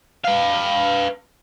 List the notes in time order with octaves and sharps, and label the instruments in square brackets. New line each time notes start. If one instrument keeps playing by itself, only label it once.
[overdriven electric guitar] B4 F5